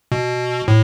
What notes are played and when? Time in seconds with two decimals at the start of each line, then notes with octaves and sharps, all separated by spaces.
0.12 B2
0.68 A2